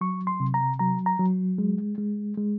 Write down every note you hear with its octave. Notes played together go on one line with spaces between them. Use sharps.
F#3 C#6
C6
C3
A#5
F#3 A#5
A#5
F#3
G#3
G#3
G#3